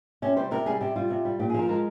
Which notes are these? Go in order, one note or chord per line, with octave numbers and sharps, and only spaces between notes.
C3 C#4
G3 C5
C3 A#4
G3 G#4
C3 G4
G3 F4
C3
G3
A#2 G4
G#4
F3 A#4
G#3 A#4